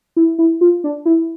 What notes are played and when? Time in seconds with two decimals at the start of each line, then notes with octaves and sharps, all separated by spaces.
0.16 E4
0.39 E4
0.61 F4
0.84 D4
1.05 E4